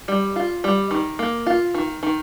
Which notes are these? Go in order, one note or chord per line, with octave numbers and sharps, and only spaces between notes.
G3
F4
G3
D#3
A#3
F4
D#3
D#3